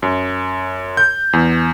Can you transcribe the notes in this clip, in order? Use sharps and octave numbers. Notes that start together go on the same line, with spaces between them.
F#2
G6
E2